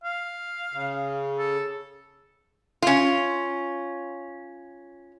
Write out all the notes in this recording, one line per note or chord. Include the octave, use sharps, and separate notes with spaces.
F5
C#3
A4
C#4 F4